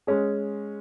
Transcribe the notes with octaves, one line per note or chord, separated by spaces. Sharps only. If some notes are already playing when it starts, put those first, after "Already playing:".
G#3 C#4 G#4